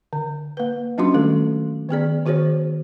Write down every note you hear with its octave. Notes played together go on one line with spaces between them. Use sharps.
D3
A#3 B4
F#3 C#4 D4 F4 F#4 C6
D#3 G3 A3 A4
D#3 B3 G#4 D5
D#3 F#4 G#4 C5 C#5